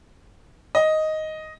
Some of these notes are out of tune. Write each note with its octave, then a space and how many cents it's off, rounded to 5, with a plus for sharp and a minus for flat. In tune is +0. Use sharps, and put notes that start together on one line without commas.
D#5 +5